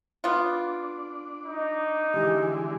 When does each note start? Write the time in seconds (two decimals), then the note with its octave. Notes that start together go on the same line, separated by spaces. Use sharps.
0.24 B3 D4 F4
1.46 D#4
2.14 D3 E3 G#3 G4